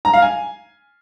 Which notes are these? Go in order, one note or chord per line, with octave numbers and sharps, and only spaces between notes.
A#5
F5
G#5